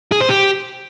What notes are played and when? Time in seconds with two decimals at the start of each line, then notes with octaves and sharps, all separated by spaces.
0.12 G#4
0.21 C5
0.29 G4